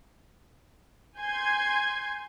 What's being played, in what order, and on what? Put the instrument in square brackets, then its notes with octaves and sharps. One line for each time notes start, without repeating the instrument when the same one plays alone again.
[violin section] G#5 C6 G6 G#6